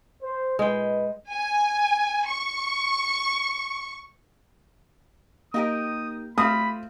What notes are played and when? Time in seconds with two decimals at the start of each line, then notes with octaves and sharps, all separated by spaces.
0.23 C5
0.59 A#2 G#3 B4 G5
1.33 G#5
2.28 C#6
5.54 A#3 D#4 G4 A#4 D#6
6.38 A3 C4 F4 B5 D#6